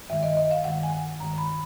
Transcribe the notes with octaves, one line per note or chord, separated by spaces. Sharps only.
G2 D#3 G#3 E5
D#5
D#5
F5
G2 D#3 G#3 F#5
G#5
G2 D#3 G#3 A#5
B5